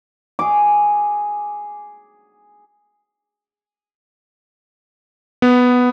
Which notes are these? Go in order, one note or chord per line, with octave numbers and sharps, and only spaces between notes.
G#4 D6
B3